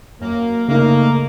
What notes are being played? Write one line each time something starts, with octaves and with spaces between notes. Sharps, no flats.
F#2 A#3
C#3 A3 A#3 D#4